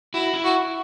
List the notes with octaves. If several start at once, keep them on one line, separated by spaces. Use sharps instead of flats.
E4 F#4
E4
F#4